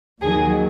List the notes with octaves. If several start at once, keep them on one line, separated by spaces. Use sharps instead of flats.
D#2 D#3 F#3 G#4